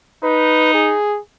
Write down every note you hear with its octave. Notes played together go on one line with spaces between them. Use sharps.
D#4 B4
G#4